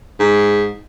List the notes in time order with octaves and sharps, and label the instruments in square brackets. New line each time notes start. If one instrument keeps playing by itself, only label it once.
[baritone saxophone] G#2